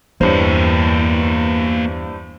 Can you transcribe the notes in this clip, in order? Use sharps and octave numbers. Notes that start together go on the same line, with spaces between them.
E2 G2 E3 A#3 C5 C#5